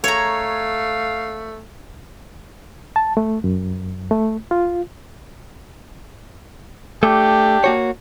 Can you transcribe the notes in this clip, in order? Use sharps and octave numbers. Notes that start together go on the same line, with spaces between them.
A3 C#5 F5 A#5
A5
A3
F#2
A3
F4
A3 D4 G4
A#3 F#4 C#5